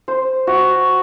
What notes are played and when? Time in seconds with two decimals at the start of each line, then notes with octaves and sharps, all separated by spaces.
0.08 C5
0.47 F#4